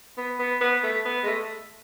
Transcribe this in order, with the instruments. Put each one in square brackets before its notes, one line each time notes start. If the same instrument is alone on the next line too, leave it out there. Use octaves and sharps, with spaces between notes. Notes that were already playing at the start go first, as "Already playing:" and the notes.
[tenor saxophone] B3
B3
B3
A3
B3
G#3
A3